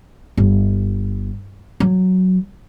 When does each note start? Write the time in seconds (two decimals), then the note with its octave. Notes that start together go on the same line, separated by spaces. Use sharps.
0.37 G1
1.80 F#3